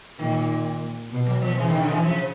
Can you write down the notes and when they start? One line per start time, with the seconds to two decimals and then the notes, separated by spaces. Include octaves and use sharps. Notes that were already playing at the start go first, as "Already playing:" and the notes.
0.19 A#2 D#3
1.11 B2
1.26 F#3
1.41 F3
1.57 C#3 E3
1.68 D#3
1.80 D3
1.91 E3
2.03 C#3 F3